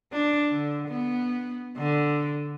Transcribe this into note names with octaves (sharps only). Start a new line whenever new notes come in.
D4
D3
B3
D3